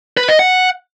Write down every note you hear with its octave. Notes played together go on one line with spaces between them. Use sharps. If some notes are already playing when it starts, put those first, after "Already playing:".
B4
D#5
F#5